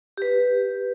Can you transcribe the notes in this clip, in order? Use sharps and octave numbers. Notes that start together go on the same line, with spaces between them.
G4 B4